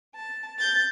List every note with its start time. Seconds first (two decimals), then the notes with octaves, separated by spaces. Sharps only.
0.15 A5
0.58 G6 A6